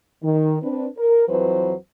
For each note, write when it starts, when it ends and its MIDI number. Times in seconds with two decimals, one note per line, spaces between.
0.23 0.58 51
0.63 0.87 60
0.63 0.87 62
0.63 0.87 71
0.97 1.26 70
1.28 1.73 41
1.28 1.73 52
1.28 1.73 54
1.28 1.73 71
1.28 1.73 72